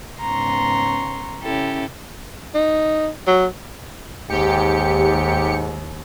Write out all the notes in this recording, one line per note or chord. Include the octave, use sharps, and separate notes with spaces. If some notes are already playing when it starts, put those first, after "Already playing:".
G#2 C#3 B3 A#5 C6 C#6
C#3 C#4 E4 G4 A4
D#4
F#3
D#2 G#2 G4 C#7